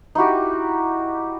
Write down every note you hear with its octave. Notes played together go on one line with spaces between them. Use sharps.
D#4 E4 F#4 G4